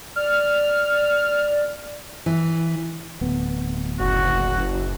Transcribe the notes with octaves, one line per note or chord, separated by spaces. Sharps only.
D5 F6
E3
D1 B3
F#1 F#4